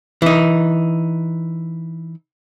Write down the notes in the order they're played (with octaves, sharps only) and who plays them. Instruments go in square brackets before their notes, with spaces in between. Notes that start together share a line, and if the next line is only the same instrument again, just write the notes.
[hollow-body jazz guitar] E3 D#4